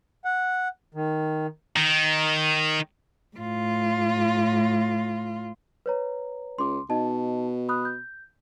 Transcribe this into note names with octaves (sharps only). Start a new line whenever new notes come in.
F#5
D#3
D#3
A2 F4
B4 C#5 A#5
C#2 C6 D6
B2 D#4 D#5 A5
B5 D#6 F#6
G6